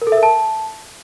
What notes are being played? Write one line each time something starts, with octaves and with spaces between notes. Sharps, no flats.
A#4
A4
E5
A#4
A5